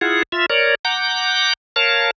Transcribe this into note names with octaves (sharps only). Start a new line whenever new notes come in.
E4 F4 G#4 F#5
F4 E5
A#4 C#5 D5
F#5 A#5 D6 G6
A#4 C#5 F5 A5